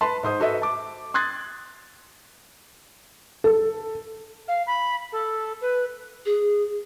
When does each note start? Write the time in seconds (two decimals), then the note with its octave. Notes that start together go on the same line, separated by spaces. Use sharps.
0.01 B4 A5 C6
0.23 G#2 C5 D#6
0.40 F#4 A4 B4 D#5 E5
0.62 A5 D6
1.14 C6 D#6 F#6 G#6 A6
3.44 A4
4.48 F5
4.66 B5
5.12 A4
5.61 B4
6.26 G#4